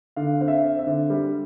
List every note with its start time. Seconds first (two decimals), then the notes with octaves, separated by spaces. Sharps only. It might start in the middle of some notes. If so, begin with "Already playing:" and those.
0.16 D3 F5
0.41 C4 F5
0.48 E5
0.64 C4
0.79 E5
0.87 D3
1.10 G3